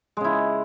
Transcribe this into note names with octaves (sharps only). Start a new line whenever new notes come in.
C#3 G#3 E4